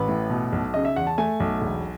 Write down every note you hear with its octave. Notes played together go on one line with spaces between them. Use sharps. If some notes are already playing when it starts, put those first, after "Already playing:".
Already playing: A1 B4
A2
B2
B1
C#3 D#5
E5
E2 F#5
A5
A3 G#5
B1
E1